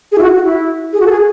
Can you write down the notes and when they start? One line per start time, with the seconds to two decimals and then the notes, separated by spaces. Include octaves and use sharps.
0.12 G#4
0.18 E4
0.22 F#4
0.34 F#4
0.45 E4
0.93 G#4
1.00 F#4
1.06 A4
1.11 G#4